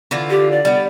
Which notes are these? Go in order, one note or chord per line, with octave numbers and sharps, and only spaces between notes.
D3 E3 F4
G4
D5
G3 B3